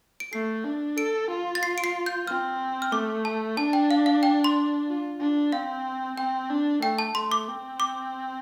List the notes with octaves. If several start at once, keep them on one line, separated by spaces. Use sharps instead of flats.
D7
A3 C7
D4
A4 D7
F4
A6
C7
D7
C7
G6
C4 F6
F6
A3 D6
A5
D4 A5
G5
F5
F5
G5
C6
F4
D4
C4 F5
C4 G5
D4
A3 G5
A5
A3 C6
D6
C4
D6